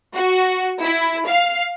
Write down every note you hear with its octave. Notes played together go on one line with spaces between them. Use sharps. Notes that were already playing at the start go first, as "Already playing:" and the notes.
F#4
E4
F5